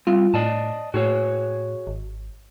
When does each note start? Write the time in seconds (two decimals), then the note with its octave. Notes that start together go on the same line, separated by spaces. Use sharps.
0.07 G3 C4 F4
0.34 A2 D5 D#5 A5
0.94 A2 F#4 G#4 C#5
1.87 G#1